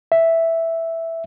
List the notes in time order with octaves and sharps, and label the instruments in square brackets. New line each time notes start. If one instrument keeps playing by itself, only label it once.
[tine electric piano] E5